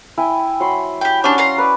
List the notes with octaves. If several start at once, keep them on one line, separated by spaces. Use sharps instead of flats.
E4 G5 G#5
F#3 B5 C6
G4 G5
C#4 D4 G4 D5 F#5
F5 A#5 C6
B4 D5